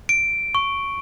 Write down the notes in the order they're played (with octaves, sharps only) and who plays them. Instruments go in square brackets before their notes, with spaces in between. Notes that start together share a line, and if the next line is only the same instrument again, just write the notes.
[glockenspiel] D7
C#6